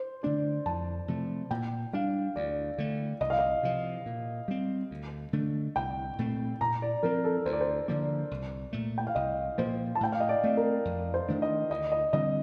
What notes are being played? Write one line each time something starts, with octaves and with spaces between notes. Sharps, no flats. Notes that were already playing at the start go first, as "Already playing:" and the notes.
Already playing: C5
D3 A3 D4 D5
F2 A5
C3 F3 A3
A#2 G5
G3 D4 F5
D2 D5
D3 A3
C2 D#5
F5
D#5
C3 F3
A#2
G3 C4
D2
D3 A3 D4
C2 G5
A#2 A3 C4
A#2 A#5
D5
F3 C4 A#4
A4
D2 C5
D5
C5
D3 F3 A#3 D5
C2
A#2 A3
G5
F5
C2 D#5
A#2 F3 A#3 C5
A5
A2 G5
F5
D#5
D5
A3 C4
A#4
F2
C5
D#3 A3 D4
D#5
D2 D#5
D#5
D3 G3 C4 D#5